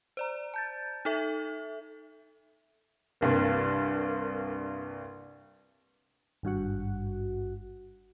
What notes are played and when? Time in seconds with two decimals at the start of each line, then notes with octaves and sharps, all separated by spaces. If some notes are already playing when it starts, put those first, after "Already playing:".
0.17 C5 D5 A#5
0.54 A5 G6 A6
1.05 D#4 A4 E5
3.21 C2 G2 A#3
6.43 G#1 G2 F#4 F#5